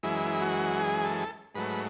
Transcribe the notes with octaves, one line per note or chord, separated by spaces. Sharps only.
F#2 E3 G#3 E4
F#4
G#4
A4
G#2 F#3 A3 B4